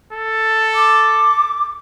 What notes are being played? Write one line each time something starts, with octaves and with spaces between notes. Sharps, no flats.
A4
D6